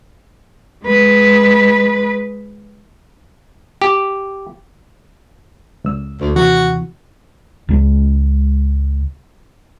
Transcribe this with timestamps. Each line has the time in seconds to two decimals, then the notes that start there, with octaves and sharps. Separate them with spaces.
0.85 G#3 B4
3.82 G4
5.84 C#2 E6
6.20 D2
6.36 D#2 C3 E3 F#4
7.69 C#2 C#3 G#3